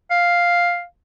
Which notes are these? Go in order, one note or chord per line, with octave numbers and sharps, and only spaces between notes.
F5